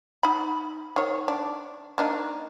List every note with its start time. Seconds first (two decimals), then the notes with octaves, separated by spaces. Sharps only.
0.23 D#4 B5
0.96 D#3 C#5
1.28 D4
1.98 A#3 D4 D#4